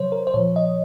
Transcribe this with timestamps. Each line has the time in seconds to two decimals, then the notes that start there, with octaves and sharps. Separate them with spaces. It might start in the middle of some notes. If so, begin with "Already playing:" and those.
Already playing: C3 F#3 C5 C#5
0.12 A#4
0.27 C5
0.34 A#2 F3 C#5
0.56 D#5